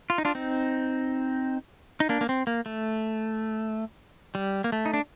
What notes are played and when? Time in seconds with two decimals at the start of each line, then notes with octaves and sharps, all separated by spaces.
0.10 F4
0.18 D#4
0.25 D4 F4
0.35 C4 D#4
2.00 D#4
2.09 A#3 D4
2.21 A#3
2.29 C4
2.47 A#3
2.66 A3
4.35 G3
4.64 A#3
4.72 A3
4.86 D#4
4.94 D4